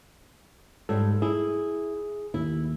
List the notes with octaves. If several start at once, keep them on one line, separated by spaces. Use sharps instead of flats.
G#2 G3 A4
E4 G#4
D#2 E4